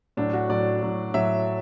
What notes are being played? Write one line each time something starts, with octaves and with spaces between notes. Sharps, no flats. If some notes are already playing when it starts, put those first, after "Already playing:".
A2 F#3 D4
F#4
A2 F#3 D5
A2 F#3
A2 F#3 E5